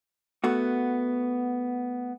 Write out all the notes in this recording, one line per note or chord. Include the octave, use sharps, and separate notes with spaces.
A3 B3 F#4